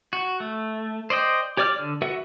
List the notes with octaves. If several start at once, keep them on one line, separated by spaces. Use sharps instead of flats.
F#4
A3
C5 D5 D#5 G5
G4 C#5 D5 D6 F6
D3
F#4 A4 B4 E5 F#5